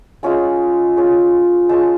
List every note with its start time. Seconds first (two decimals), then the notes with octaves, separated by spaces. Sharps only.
0.23 G#3 C#4 F4 G#5
0.97 G#3 C#4 F4
1.69 G#3 C#4 F4 A5